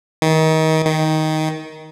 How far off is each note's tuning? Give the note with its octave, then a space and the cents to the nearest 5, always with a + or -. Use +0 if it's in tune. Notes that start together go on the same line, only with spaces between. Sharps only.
D#3 +30
D#3 +10